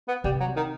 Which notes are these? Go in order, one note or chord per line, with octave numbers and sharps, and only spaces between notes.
B3
C3 G3
F#3
D#3